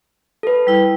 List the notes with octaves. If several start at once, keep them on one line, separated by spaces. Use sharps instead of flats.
A4 B4
G3 E4